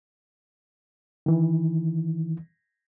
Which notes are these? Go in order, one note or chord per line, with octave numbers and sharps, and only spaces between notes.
D#3 E3